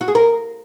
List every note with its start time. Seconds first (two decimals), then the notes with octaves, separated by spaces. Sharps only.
0.01 F#4
0.08 G#4
0.15 A#4